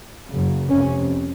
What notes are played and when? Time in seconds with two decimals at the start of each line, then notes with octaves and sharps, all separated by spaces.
0.28 F#1 F#2 C#3
0.70 F1 F2 C3 C#4